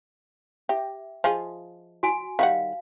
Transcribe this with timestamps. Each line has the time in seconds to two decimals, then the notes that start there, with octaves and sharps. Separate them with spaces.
0.69 G4 E5
1.24 F3 F4 G#4 D#5
2.03 F#4 G#5
2.39 D#3 G3 F5 F#5